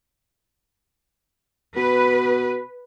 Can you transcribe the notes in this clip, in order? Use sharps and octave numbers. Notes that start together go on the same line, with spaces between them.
B2 B4